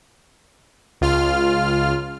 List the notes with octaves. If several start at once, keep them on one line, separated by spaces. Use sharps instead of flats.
C#2 F4 F6